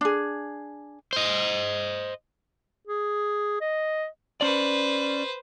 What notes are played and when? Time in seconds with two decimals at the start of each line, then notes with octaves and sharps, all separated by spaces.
0.01 D4 G#4
1.13 C5 D#5
2.87 G#4
3.61 D#5
4.41 C#4 B4 C5 D5